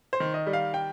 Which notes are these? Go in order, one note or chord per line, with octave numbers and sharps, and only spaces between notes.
C5
D#3
D#5
G3
F5
G5